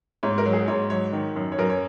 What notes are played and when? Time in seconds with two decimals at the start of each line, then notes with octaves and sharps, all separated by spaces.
0.23 G#2 C#5
0.38 A#4
0.46 F#3
0.53 G#4
0.68 G#2 C#5
0.90 F#3 C#5
1.13 D#3
1.36 F#2
1.52 C#5
1.58 F#2 A#4
1.70 C#5